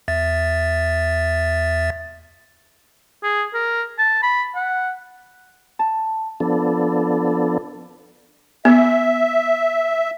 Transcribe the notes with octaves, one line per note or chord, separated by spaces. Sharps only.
E2 E5 A6
G#4
A#4
A5
B5
F#5
A5
F3 B3 D4 A4
B3 E5